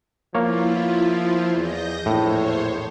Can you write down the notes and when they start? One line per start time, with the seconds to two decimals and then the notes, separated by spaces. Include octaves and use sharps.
0.35 F3 A#3 B3 E4 F4 C#5
1.55 E2 D#5 G6 A#6
2.06 A#1 E2 A2 C5 C#5